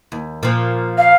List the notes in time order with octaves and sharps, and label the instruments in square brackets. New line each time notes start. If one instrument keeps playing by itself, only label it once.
[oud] D#2
A#2 F3
[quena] F5